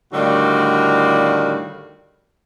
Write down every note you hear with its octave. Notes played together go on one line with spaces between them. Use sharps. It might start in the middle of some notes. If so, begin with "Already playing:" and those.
A2 D3 D#3 G3 F#4 F5